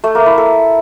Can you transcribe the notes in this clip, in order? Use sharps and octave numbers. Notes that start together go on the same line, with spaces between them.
A3
A#3
E4
A4